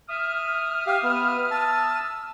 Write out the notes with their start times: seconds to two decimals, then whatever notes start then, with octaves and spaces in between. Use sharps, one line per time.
0.09 E5 D#6 F6
0.87 G4 F5
1.03 B3
1.51 A5 E6